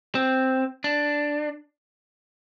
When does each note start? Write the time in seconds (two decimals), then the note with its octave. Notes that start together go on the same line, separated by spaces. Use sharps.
0.15 C4
0.84 D4